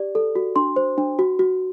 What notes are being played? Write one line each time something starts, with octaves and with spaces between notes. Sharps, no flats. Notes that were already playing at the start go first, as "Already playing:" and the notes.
Already playing: G4 D5
A4
F#4
D4 C6
C5
D4
F#4
F#4